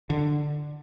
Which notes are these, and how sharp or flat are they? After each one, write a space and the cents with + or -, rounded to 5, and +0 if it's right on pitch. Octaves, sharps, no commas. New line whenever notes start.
D3 +10